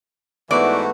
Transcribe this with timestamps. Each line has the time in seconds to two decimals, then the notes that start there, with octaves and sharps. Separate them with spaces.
0.51 G#2 E3 A3 B3 F#4 C5 D5